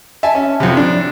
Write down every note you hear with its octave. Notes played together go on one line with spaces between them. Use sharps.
E5 G#5 A5
C#4
F2 C3
D4